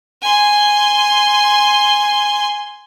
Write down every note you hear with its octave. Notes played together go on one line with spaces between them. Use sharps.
G#5 C6